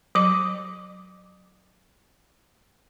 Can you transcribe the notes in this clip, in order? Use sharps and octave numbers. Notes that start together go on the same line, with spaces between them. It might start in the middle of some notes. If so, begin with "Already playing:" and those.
F#3 D6